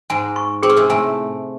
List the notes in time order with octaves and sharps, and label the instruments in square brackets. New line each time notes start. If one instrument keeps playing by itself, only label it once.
[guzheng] G#2 G#3 [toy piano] G#5
[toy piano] C#6
[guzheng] C4 [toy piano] G#4
[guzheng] C#4
C3 C4
[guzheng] A2 A3 [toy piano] G#5